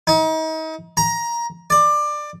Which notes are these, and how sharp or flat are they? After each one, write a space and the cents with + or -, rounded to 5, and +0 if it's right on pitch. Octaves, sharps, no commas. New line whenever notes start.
D#4 +35
A#5 +15
D5 +20